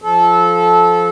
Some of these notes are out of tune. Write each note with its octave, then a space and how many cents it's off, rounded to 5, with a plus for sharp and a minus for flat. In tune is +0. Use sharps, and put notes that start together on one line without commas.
F3 +0 A4 -20